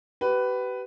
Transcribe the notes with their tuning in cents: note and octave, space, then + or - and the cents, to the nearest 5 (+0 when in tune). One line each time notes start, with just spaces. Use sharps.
G4 -40 B4 +10